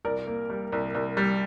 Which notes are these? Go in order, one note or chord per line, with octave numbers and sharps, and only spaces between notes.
C2 A#4 D5
A#3
G3
C2
C2
G3